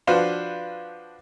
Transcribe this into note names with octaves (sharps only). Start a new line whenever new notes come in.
F3 D4 F#4 B4 C5 F5